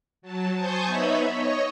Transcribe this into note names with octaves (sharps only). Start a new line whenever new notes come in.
F#3 A5
C5 G#5 A5 C#6 D#6 G6
B3 D#4 C#5 E5 B5
C#5 D#5 C#6